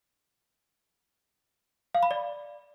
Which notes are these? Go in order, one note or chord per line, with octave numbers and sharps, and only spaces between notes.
F5
B5
D5